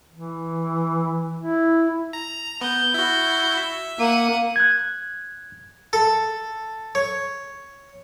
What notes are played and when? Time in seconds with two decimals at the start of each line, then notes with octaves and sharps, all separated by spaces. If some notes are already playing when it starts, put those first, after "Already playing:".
0.12 E3
1.39 E4
2.13 A#5
2.61 B3 G6
2.94 E4 F#4
3.57 E5
3.99 A#3 F#5 D#7
4.56 F#6 G#6
5.93 A4
6.95 C#5